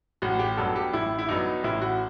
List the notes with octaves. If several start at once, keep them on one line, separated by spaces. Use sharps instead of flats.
A1 F#4
G4
G2 F#3 B3 A4
G4
A1 E4
E4
G2 F#3 B3 D#4
A1 E4
F#4